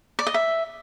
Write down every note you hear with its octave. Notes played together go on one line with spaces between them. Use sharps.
D5
D#5
E5